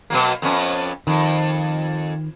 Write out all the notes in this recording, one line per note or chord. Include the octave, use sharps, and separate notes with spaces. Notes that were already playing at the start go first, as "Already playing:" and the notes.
B2 F#3 A#3
F2 B3 C#4
F2 D#3